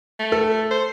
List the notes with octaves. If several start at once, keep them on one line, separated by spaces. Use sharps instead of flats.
A3
A4
C5